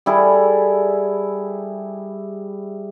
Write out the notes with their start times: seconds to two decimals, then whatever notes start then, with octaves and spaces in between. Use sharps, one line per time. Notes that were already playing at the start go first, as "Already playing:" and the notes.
0.06 G3 E4 G#4 A4